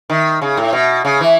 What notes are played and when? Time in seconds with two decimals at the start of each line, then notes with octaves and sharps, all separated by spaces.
0.10 D#3
0.42 C#3
0.57 A2
0.73 B2
1.05 C#3
1.21 E3